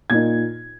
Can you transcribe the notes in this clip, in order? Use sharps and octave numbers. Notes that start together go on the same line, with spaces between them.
A#2 A#3 D#4 G#6